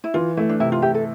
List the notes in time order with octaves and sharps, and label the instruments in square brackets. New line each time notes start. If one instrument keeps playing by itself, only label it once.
[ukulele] E4
[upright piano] E3 [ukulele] F4
[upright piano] A3 [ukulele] E4
[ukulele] D4
[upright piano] C3 [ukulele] E4
[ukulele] F4
[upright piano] E4 [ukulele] G4
[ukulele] A4